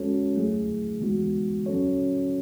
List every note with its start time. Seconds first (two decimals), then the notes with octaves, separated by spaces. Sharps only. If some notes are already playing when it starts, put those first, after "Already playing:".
Already playing: G#3 C#4 F#4 A4 C#5
0.36 F#3 A3 E4 G#4
1.01 E3 G#3 B3 D#4 F#4
1.66 F#3 C#4 F#4 A4 C#5